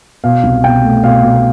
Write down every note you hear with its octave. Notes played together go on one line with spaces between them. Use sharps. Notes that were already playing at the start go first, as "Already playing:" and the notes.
B2 F5
C2
B2 G5
A3
B2 F5
B2